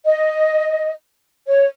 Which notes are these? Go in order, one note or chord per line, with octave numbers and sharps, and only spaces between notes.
D#5
C#5